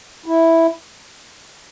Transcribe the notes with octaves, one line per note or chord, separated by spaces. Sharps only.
E4